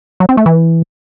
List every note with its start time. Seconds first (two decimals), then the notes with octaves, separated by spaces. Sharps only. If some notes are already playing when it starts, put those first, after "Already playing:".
0.20 F#3
0.29 C4
0.37 A3
0.46 E3